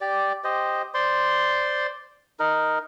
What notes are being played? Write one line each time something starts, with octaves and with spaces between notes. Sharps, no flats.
G4 D5
G4 C5 D#5
C5 D5 C6
D#4 A#4